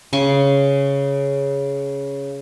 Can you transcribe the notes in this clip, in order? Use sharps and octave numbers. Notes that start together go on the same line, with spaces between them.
C#3 C6 C#6